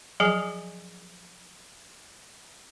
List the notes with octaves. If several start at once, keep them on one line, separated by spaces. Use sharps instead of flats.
F3 F#3 G#4 G#5